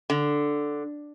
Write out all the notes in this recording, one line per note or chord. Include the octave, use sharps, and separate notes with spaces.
D3